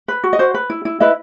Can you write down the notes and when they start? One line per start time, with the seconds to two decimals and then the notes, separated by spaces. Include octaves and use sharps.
0.08 B4
0.24 F#4
0.33 D#5
0.39 F#4 C5
0.54 B4
0.70 E4
0.85 E4
1.00 E4 B4 D#5